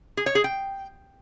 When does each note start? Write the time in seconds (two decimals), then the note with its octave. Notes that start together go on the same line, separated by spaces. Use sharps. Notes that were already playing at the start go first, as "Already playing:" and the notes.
0.17 G#4
0.26 C#5
0.35 G#4
0.44 G5